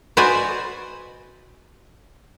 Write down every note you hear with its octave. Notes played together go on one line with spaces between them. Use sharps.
F#4 B4 C5 D5 D#5 G#5